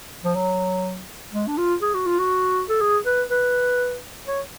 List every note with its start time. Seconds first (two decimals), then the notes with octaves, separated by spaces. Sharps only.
0.24 F3
0.36 F#3
1.33 G#3
1.47 D4
1.58 F4
1.82 G#4
1.94 F#4
2.06 F4
2.19 F#4
2.69 A4
2.81 G#4
3.06 B4
3.30 B4
4.28 C#5